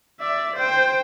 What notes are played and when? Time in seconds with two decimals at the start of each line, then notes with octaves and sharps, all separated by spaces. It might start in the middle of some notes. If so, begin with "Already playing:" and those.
0.20 D5 E5
0.56 C5 G5